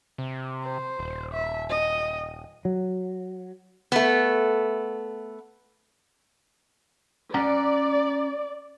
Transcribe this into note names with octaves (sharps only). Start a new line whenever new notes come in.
C3
C5
D#1
E5
D#5
F#3
A3 B3
C#4 D5 F#5 A#5